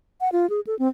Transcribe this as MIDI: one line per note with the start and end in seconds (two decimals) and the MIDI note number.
0.21 0.29 78
0.32 0.49 65
0.50 0.60 68
0.67 0.77 69
0.79 0.88 60